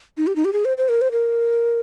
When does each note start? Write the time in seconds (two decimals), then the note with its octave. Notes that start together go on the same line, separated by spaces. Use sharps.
0.17 D#4
0.27 G4
0.36 D#4
0.45 G4
0.53 G#4
0.65 C5
0.78 C5
0.89 A#4
1.01 C5
1.12 A#4